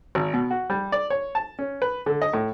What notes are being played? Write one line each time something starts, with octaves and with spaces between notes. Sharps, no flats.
G#1
B2
F#4
G3
D5
C#5
A5
C#4
B4
D3
D#5
A2